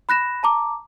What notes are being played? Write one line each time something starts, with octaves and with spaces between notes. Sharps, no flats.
B5 F#6 A#6 E7
A5 A#5 D6